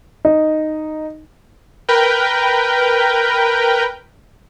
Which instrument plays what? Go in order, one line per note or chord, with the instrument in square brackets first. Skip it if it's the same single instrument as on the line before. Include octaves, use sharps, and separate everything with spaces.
[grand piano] D#4
[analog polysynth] A#4 B4 G5